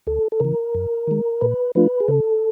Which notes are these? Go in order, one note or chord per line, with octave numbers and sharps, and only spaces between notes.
D2 A4
A4
C#3 E3 A#4
F#2
D#3 G#3
A#2 B4
F3 A3 D4 F4 B4
G#4
C#3 A4